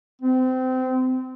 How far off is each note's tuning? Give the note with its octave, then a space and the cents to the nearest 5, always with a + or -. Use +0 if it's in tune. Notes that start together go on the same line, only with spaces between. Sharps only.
C4 -25